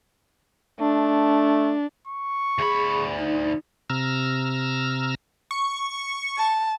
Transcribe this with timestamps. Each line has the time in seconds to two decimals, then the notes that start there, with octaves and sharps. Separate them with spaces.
0.80 A3 D4
2.07 C#6
2.59 D2 G#4 B5
3.19 D#4
3.90 C3 A#5 E6 F6
5.51 C#6
6.38 A5